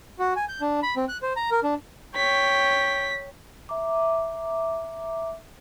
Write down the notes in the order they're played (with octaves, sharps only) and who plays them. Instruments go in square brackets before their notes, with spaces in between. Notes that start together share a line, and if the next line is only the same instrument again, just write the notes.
[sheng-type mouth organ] F#4
G#5
G6
D4
B5
C4
F#6
C5
A#5
A#4
D4
[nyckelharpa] C#5 G5 [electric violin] B6
[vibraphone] E5 A#5 D6